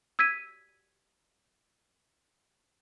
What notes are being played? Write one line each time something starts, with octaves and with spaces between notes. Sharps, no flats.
E6 G#6 B6 D#7